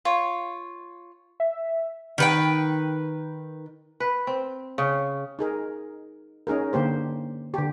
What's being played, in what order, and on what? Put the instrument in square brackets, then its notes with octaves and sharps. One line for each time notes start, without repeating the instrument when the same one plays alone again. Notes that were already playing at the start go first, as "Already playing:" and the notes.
[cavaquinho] F4 C#5
[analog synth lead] E5
[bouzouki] D#3 B4 G5
[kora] B4
C4
C#3
[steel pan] D#4 G#4 A#4
C#4 D#4 G#4 A#4
D3 A#3 G4 C5
D3 G4